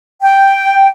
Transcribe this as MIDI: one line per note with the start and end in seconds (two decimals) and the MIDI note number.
0.22 0.87 79